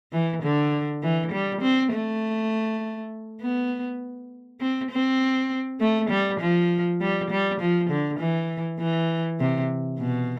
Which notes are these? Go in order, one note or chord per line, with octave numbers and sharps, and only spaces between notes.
E3
D3
E3
G3
C4
A3
B3
C4
C4
A3
G3
F3
G3
G3
F3
D3
E3
E3
C3
B2